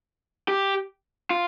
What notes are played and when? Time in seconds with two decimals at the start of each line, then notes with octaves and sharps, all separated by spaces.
0.48 G4
1.30 F4